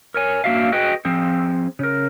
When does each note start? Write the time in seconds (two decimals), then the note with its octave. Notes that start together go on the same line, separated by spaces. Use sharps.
0.14 A#4 C#5 G#5
0.44 A#3 D4 F#4 E5 F5
0.72 F#4 G#4 B4 D#5 G5
1.05 F3 C4 G#4 C5
1.79 C#3 A#4